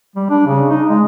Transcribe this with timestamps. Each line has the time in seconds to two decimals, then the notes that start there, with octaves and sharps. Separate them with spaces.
0.16 G3
0.30 D4
0.47 C#3
0.70 D#4
0.89 G#3